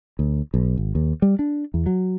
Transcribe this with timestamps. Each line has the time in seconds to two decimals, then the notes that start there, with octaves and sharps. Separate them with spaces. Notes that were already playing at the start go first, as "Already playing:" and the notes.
0.19 D2
0.54 B1
0.77 G#1
0.95 D#2
1.22 G3
1.39 D4
1.74 E2
1.86 F#3